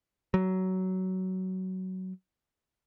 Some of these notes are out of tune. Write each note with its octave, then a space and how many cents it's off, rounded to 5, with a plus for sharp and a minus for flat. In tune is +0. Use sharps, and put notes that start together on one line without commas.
F#3 +15